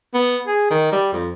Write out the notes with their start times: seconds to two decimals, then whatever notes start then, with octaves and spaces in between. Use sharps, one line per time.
0.14 B3
0.47 G#4
0.71 D#3
0.92 G3
1.13 F2